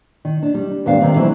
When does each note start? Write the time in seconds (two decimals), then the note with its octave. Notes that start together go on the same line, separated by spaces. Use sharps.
0.25 D#3
0.42 D4
0.54 G3
0.86 D#2 G#2 B3 D4 G4 F5
1.00 C3 D#3 G3 C4
1.16 E3 F#3 G#3 C4 E4